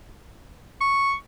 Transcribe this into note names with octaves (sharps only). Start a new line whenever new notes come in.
C#6